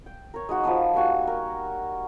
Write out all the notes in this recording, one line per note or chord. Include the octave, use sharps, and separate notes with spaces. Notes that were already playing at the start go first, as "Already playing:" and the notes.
G5
A#4 C#5
G#3 D#4 F#4
F3 B4 A5 D#6
G3 A#3 F#4 G#5
A#4